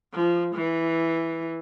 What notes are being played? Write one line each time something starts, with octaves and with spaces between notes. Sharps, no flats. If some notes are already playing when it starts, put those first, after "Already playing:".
F3
E3